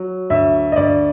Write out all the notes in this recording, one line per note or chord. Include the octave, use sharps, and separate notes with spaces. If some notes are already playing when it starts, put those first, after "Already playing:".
Already playing: F#3
D2 E5
D#5
D2 D5